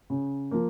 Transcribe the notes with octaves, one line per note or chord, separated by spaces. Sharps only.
C#3
F3 A#3